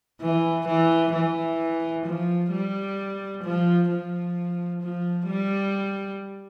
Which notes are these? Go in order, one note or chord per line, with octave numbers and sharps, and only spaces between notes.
E3
E3
E3
F3
G3
F3
F3
F3
G3